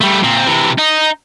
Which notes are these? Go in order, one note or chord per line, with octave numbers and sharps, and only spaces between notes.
G3 A3
A#2 C4
C3 E3
D#4